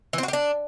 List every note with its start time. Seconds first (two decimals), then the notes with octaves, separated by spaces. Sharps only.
0.13 E3
0.18 C4
0.23 F#4
0.28 G4
0.33 D4